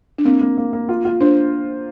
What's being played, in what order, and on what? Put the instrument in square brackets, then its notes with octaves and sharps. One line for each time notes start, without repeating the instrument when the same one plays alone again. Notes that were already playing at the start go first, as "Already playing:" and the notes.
[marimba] D4
[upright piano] A#3 [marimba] C4
[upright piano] A#3
A#3
A#3
F4
F4
[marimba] D4 [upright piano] C5